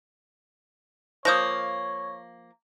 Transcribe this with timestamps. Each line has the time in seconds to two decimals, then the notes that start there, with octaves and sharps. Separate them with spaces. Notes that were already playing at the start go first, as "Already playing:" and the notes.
1.25 F3 A#3 C#5 D#6 G6 A#6